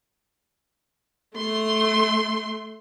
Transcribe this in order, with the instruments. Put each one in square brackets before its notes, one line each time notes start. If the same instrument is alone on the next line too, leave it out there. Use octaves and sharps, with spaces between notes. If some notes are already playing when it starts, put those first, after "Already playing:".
[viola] A3 C6